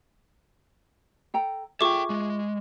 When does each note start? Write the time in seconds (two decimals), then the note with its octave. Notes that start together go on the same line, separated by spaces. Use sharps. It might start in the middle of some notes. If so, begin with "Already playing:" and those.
1.34 A4 G5 A#5
1.81 F4 G#4 A4 E5 G5 C#6 D6
2.10 G#3